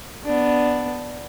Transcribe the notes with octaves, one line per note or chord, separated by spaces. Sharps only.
B3 D4